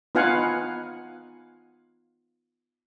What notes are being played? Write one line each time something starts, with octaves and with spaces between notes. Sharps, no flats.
B3 D#4 F4 F5 F#5 G#5